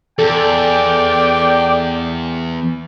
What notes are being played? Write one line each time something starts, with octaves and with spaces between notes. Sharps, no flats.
E2 A4 D5 G5